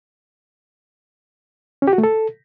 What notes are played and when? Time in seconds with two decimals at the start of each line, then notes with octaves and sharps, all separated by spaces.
1.82 C#4
1.88 G4
1.93 F#4
1.98 A3
2.04 A4